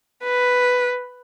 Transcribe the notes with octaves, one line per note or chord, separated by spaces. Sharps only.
B4